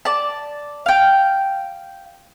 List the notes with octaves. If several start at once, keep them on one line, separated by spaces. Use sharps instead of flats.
D5 A5
F5 G5